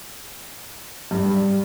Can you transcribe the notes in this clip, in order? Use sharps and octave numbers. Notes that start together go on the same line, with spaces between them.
G2